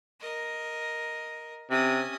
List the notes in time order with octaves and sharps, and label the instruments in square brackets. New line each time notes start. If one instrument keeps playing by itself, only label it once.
[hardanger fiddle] A#4 D#5
[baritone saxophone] C3 [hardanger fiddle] C#4 D#6